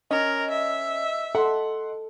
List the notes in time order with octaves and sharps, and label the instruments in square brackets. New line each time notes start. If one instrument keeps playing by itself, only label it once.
[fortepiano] C#4 [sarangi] A#4 [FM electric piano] D#5
[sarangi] E5
[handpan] A4 [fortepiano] F#5 C6